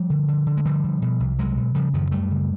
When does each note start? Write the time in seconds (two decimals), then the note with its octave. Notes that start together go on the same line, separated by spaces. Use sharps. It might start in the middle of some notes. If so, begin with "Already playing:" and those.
Already playing: F3 G3
0.10 D3
0.28 D3
0.46 D3
0.57 G#3
0.65 D3 F3 G3
0.84 D3
1.02 B2
1.20 C2
1.38 C2 F#3 G#3
1.57 B2
1.75 C#3 F3 G3
1.93 F#2 D#3 F3
2.11 F#2 G3 A3
2.31 C#3